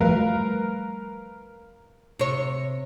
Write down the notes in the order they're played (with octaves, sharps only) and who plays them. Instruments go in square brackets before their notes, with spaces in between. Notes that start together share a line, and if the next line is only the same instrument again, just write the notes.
[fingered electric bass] F3 G3 A3 [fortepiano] A#4 B4 F5
[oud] C3 C#5